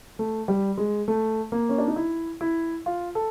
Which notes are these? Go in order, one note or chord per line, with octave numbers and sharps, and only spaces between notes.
A3
G3
G#3
A3
A#3
C#4
D4
D#4
E4
E4
F4
A4